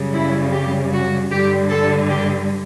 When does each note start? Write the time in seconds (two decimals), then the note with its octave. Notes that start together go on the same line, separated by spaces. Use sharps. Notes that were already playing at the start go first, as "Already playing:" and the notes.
Already playing: F#2 C#3 G3
0.14 E4
0.53 G4
0.92 F#4
1.31 G2 D3 G3 G4
1.70 A4
2.10 G4